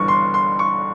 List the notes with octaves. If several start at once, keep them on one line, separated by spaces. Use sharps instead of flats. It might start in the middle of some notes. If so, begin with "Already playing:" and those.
Already playing: G1 G2 E3 C#6
C6
C6
C#6